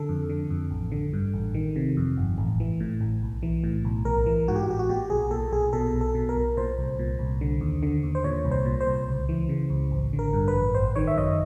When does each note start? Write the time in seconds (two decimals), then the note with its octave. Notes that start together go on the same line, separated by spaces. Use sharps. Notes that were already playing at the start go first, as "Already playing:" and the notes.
Already playing: D3 A4
0.09 F2
0.29 D3
0.50 F2
0.71 A1
0.92 D3
1.13 G2
1.34 A1
1.54 D#3
1.76 C3
1.97 F2
2.17 G1
2.38 A1
2.60 E3
2.80 A2
3.01 A1
3.23 B1
3.43 E3
3.64 A2
3.85 B1
4.05 A1 A#4
4.26 E3
4.48 G#2 F#4
4.56 G4
4.63 F#4
4.68 A1 G4
4.79 F#4
4.89 A#2 G4
5.10 B1 G#4
5.31 A#2 A4
5.52 B1 G#4
5.73 B2 A4
5.94 B1
6.01 A4
6.15 B2
6.29 A#4
6.37 B1
6.57 A#2 C5
6.78 C2
6.99 A#2
7.19 C2
7.41 D3
7.61 D#2
7.83 D3
8.03 D#2
8.15 C5
8.24 A#2 C#5
8.45 C2
8.52 C5
8.65 A#2
8.81 C5
8.87 C2
9.08 C#2
9.29 E3
9.49 C#3
9.70 C#2
9.91 A1
10.13 D3
10.19 A#4
10.33 G2
10.48 B4
10.54 A1
10.75 G1 C5
10.96 D#3 C#5
11.07 E5
11.16 F#2 D#5